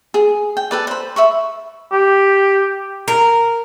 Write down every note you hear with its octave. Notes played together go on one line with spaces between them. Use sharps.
G#4
G5
A4 B4 D5
C5 B5
E5 B5 C#6
G4
A#4